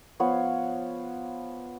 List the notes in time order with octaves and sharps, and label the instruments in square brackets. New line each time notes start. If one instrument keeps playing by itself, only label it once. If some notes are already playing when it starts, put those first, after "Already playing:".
[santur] F3 B3 C#5 F5